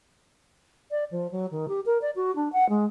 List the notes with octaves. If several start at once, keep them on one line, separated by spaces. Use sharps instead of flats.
D5
F3
F#3
D#3
G4
A#4
D5
F#4
D4
F#5
G#3